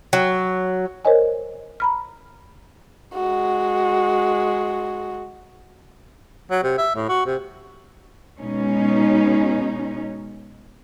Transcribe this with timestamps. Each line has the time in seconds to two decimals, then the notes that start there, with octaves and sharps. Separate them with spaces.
0.13 F#3
1.05 A#4 C5 C#5 D#5 G#5
1.80 A#5 B5 F6
3.14 G#3 F#4
6.51 F#3
6.63 C3
6.78 E5
6.95 A2
7.08 F#4
7.26 C3
8.39 B2 G#3 C#4 D#4